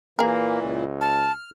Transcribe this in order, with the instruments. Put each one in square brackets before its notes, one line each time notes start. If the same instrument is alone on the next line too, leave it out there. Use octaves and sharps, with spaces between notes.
[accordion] A#2 E3 [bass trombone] A#3 [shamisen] G#4 A#4
[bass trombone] C#2
[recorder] A5 [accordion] F6